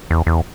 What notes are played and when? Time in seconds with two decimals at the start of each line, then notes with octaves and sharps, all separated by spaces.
0.11 E2
0.27 E2